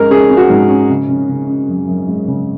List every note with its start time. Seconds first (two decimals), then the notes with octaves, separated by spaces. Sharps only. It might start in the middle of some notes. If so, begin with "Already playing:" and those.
Already playing: G#2 G#3 C#4 A#4
0.10 C#4 G#4
0.30 C#4
0.37 F#4
0.50 G#2
0.70 C#4
0.90 C#3
1.09 C#3
1.29 C#3
1.49 C#4
1.68 F#2
1.88 F#2
2.08 G#3
2.28 C#3